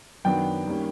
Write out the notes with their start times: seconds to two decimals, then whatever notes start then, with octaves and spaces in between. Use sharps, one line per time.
0.25 F#2 D#3 F#3 B3 D4 G5
0.67 D#3 G3 A#3 C#4